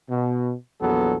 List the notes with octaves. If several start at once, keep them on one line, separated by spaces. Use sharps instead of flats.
B2
A#1 E2 F#3 B3 A4